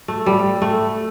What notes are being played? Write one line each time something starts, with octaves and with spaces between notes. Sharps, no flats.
A3
G3
A3